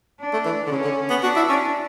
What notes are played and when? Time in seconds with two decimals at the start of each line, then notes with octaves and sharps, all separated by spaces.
0.20 D4
0.33 A3
0.46 E3
0.67 D3
0.71 C#3 C#4
0.85 D3
1.10 B3
1.23 D4 F#4
1.36 E4
1.49 C#4